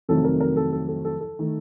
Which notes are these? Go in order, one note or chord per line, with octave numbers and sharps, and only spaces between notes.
F2 C3 D#3 F#3 A3 A4
A#4
A#4
A4
A4
A4
A4
A4
D#3 A3